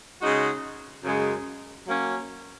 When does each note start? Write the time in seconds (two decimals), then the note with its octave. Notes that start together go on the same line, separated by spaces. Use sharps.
0.20 C#3 G#3 D#4 F#4
1.03 F#2 C#3 G#3 C#4
1.86 F#3 A#3 C#4